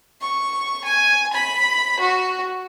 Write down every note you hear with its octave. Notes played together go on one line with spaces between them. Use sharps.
C#6
G#5
B5
F#4